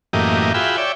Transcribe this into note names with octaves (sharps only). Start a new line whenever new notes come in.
F#2 A2 E3 A#3 G4 D#5
F4 F#4 G#4 E5 G5 B5
C#5 D5 E5 G5